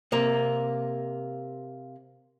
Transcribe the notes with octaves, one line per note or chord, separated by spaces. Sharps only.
C3 A#3